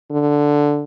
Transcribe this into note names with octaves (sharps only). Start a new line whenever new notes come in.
D3